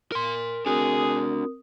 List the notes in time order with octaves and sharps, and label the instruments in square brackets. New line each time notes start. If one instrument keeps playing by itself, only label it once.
[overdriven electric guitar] A#4 C6
[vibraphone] C4 A#4 D#6 [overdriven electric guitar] D4 F#4 [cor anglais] G#4